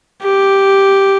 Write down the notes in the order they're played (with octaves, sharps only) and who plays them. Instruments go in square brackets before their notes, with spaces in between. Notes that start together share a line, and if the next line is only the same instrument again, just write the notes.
[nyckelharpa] G4